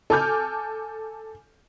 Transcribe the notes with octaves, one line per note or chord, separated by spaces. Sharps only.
A4 G#5 D6 F6 G6